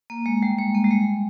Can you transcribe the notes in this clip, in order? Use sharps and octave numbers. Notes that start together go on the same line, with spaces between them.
A#3
G#3
G3
G#3
A#3
G3
G#3